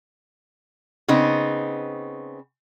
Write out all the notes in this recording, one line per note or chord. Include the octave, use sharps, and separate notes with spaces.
C#3 B3 C4 D#4